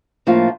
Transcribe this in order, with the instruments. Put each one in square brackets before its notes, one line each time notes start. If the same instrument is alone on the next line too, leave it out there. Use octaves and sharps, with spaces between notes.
[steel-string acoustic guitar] A2 F3 A#3 D4 F4